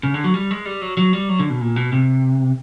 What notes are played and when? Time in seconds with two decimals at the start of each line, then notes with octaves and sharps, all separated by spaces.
0.03 C#3
0.14 D3
0.24 F#3
0.34 G3
0.51 G#3
0.65 G3
0.82 F#3
0.97 F#3
1.13 G3
1.29 F#3
1.39 D3
1.50 B2
1.61 A#2
1.76 B2
1.92 C3